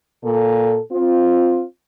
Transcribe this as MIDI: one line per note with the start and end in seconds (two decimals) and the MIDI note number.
0.25 0.79 46
0.25 0.79 69
0.92 1.64 60
0.92 1.64 65